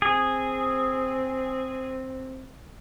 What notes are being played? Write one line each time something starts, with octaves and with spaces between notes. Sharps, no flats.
C4 G#4